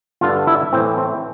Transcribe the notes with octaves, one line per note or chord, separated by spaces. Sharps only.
G2 D3 F4
E4
A2 E3 C4
C4